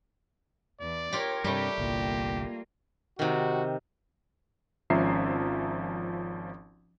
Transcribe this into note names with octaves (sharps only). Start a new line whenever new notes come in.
E2 D5
F4 G4 A#4 C#5
G2 C3 G3 A3 G4
G1 C2 A#3 F4
C3 D#3 F#4
G#1 F3 C#4 E5 A#5 C7